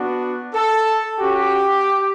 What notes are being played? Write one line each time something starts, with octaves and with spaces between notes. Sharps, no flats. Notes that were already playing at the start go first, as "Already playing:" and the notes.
Already playing: B3 D4 F#4
A4
C#4 F#4 G4